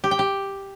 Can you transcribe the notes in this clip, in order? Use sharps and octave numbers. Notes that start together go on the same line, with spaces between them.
G4
G5
G4